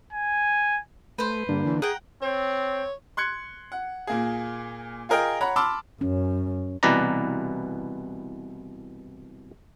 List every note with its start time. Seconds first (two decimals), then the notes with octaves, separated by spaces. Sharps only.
0.13 G#5
1.18 A3 B4 C5
1.49 G2 D3 A#3 D4
1.66 E3
1.82 G#4 F#5 G5 A#5
2.22 C4 C#5
3.17 C6 F#6 G#6 C#7
3.72 F#5
4.07 A#2 A#3 G#4
5.09 F4 G#4 A#4 D#5 G5
5.41 C#5 F#5 A#5 B5
5.56 A5 B5 C6 D6 E6 F6
6.01 F#2 C#4
6.83 C2 B2 E3 B4 D5 A#5